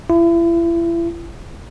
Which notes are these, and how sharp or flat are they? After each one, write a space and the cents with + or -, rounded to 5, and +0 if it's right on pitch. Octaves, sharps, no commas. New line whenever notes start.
E4 +35